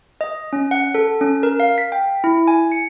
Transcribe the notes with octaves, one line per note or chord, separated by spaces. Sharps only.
D#5
C#4
F#5
A4
C#4
A#4
F5
B6
G5
E4
G#5
C#7